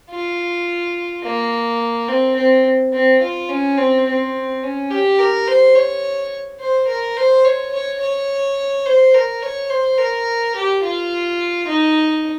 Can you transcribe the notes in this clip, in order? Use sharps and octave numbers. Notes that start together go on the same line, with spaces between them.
F4
A#3
C4
C4
C4
F4
C#4
C4
C4
C#4
G4
A#4
C5
C#5
C5
A#4
C5
C#5
C#5
C#5
C5
A#4
C#5
C5
A#4
G4
F4
D#4